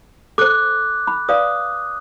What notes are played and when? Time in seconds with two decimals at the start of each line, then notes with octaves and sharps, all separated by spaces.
0.38 A4 C5 D6 F#6
1.07 B5
1.29 B4 D5 F5 D#6